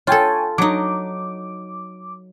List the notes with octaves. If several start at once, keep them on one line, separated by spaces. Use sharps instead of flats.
F4 A4 C#5 G5 G#5
F#3 D#4 D6